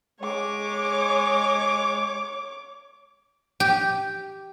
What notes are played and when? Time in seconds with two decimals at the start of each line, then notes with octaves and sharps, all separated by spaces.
0.21 G#3 C#5 D6
3.60 G4